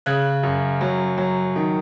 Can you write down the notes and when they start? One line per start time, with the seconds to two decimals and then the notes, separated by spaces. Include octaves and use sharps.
0.06 C#3 F#6 G#6
0.43 F#2
0.81 F#3
1.18 F#3
1.56 D#3